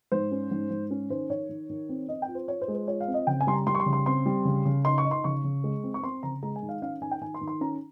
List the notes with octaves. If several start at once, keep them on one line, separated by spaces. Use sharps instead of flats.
G#2 C5
C#4
G#2
G#2
C#4
D#3 C5
D#3 C#5
D#3
D#3
C4
C4 D#5
G5
F4
C5
F4 C#5
C5
G#3
C5
F4 C#5
F5
C4
D#5
C#3 G5
G#5
G3 C6
A#5
G3 C6
C#6
C6
C#3
C6
C4 C6
G3
C#3
C#3
D#4 C6
C#6
D#4
C6
C#3 C#6
C#3
G#3
C4
C#6
C4 C6
C#3 A#5
G#3 A#5
G#5
D#3
F5
C#4 F5
D#3 G#5
G5
D#3 G#5
C6
D#3
C6
C#4 A#5